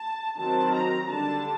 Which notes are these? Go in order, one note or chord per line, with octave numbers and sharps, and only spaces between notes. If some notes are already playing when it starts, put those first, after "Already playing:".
Already playing: A5
D#3 F#3 C4 A5
A#5
D3 G3 D4 A5